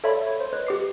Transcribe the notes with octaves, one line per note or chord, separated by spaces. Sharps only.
A4 C#5 D5 E5 F5 B5
C#5
C5
B4 C#5 D#5
G4 D6 C7